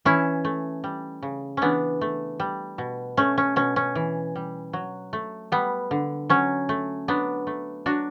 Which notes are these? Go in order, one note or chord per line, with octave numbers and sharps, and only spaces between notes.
E3 C#4 E4
A3
G3
C#3
E3 B3 C#4 D4
A3
G3
B2
A3 C#4
C#4
B2 C#4
C#4
E3
G3
F#3
A3
G3 B3
D3
F#3 C#4
A3
F#3 B3 D4
A3
F#3 D4 F#4